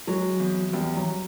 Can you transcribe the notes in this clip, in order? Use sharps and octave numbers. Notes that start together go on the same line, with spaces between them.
F#3 G#3
E2
E2 G3
F#3